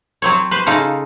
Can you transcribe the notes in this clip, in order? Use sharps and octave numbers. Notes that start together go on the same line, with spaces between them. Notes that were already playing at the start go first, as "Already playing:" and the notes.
F#3 C4 C#5
B4 C5
C#3 D#4 F4 A4